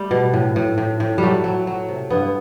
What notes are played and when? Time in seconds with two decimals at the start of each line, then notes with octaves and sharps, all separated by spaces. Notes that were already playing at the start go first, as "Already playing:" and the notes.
Already playing: G3 A3
0.11 B2
0.33 A2
0.56 A2
0.78 A2
1.00 A2
1.18 F#3 G3 A3
1.44 F#3
1.67 F#3
1.88 C3
2.10 G2 B3